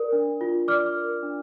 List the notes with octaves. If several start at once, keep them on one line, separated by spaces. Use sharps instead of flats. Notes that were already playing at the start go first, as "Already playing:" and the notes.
Already playing: A#4 D5
D4
F4
D5 D6 F6
A#4
D4